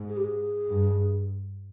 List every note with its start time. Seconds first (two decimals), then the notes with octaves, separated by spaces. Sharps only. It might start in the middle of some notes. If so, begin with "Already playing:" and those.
Already playing: G#2
0.09 G#4
0.17 G4
0.24 G#4
0.68 G2